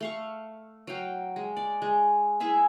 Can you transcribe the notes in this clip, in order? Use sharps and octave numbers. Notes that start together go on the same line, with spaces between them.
A3 F5 C#6
F#3 F5 G5
G#3
D5
G#3
E4 G#4 E5 F5